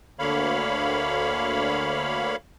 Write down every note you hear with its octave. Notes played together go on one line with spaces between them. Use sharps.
D2 D3 A#3 C#5 F5 B5